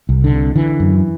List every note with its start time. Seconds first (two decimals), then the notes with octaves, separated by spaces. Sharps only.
0.09 C2
0.24 D3
0.33 C3
0.55 D3 E3
0.80 F#2